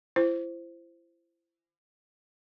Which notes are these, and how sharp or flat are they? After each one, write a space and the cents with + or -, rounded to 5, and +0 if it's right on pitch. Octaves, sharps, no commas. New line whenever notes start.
E4 +40 C5 +0